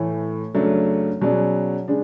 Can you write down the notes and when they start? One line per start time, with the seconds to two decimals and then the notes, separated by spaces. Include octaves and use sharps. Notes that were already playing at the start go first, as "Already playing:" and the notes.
Already playing: A2 E3 A3
0.55 F#2 C#3 F#3 A3 D4
1.21 B2 F#3 C#4 G#4 D5
1.88 C#3 G#3 D4